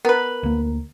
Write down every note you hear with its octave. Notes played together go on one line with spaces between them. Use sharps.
B3 A#4 B4
D2 A#3